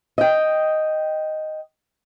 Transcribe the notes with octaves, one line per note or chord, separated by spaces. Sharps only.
D#5 G5